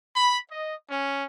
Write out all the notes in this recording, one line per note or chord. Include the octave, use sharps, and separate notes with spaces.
B5
D#5
C#4